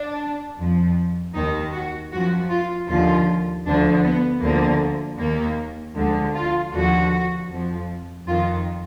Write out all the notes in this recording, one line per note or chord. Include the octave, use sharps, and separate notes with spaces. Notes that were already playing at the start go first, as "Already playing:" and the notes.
Already playing: D4
F2 F3
D#2 D#3 D#4
F#4
F#2 F3 F#4
F4
D#2 D3 F3 F4
D2 D3 F3 D4
B3
D2 D3 F3 A#3
D#2 D#3 A#3
D2 D3 F3 G#3
F4
D#2 D3 F3 F#4
F2 F3
F2 D#3 F4